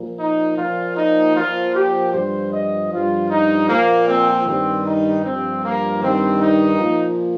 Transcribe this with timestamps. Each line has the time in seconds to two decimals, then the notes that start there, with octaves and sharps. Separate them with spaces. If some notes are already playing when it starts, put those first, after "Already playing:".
Already playing: A#2 F3
0.20 D#4
0.58 A#2 F3 F4
0.97 D#4
1.36 A#2 F3 F4
1.74 G4
2.13 G2 F3 C5
2.52 D#5
2.92 G2 F3 F4
3.29 D#4
3.68 A#2 F3 A#3
4.08 C4
4.46 G2 D#3 C4
4.85 D#4
5.24 G2 F3 C4
5.63 A#3
6.02 G2 D#3 C4
6.40 D#4
6.79 A#2 F3